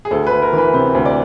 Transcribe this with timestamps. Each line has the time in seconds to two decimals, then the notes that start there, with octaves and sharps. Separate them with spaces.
0.05 G#4
0.11 D2 A4
0.27 B4
0.31 D2
0.42 A#4
0.53 E3
0.58 B4
0.74 C3 C5
0.95 D2
1.05 D5